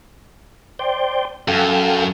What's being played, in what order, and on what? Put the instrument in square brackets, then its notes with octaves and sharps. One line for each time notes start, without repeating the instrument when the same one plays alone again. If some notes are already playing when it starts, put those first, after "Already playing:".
[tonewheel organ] C5 D5 G5
[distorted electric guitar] F#2 [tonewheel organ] A4 F5 G5